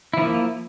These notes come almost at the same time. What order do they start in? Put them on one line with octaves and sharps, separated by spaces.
E4 F3 A#3